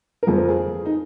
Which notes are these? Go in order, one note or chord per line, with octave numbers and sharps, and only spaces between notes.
A#4
F2 F3 G#4
A#4
G#4
D#4